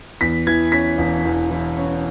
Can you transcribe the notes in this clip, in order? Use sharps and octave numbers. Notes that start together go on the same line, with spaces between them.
E2 B6
E3 G#6
C#4 B6
E1
E2
E3
C#4